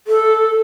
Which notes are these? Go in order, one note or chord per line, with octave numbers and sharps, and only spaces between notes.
A4